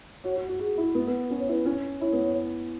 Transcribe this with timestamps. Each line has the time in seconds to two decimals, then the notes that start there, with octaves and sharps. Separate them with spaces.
0.24 F#4 C#5
0.36 F#4
0.48 F#4
0.59 F#4 G#4
0.78 E4
0.95 B3
1.07 B3
1.30 C#4 B4
1.40 C#5
1.48 E4 B4
1.65 C#4
2.01 E4 C#5
2.13 B3